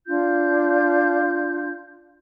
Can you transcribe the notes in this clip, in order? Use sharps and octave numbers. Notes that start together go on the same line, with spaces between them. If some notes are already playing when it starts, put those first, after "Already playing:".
D4 F4 G6